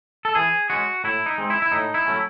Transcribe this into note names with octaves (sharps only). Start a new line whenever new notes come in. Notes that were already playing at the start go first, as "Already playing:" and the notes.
A4
E3 G#4
G#3 C#4 F#4
A2 E4
D#4
G#3 C4
E4
E4
A2 D#4
E4
F#3 A3 C#4